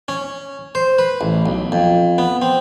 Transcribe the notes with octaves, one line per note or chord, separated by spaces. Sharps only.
C#4
C5
B4
A1
B1
F2
B3
C4